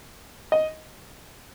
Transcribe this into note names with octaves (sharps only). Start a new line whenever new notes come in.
D#5